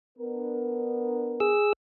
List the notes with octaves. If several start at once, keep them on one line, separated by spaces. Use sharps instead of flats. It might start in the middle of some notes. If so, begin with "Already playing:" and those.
B3 D4 A#4
G#4 E6